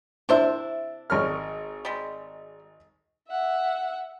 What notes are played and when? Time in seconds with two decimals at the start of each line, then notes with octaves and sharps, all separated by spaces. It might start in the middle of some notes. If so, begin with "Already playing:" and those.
0.29 C3 D4 E4 C5 E5
1.10 G#1 C#5 F6
1.85 G3 G#3
3.28 E5 F#5